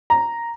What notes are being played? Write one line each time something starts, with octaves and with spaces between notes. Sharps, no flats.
A#5